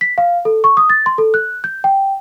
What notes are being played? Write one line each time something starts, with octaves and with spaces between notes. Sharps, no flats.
B6
F5
A4
C#6
D#6
A6
C6
A4
F#6
G6
G5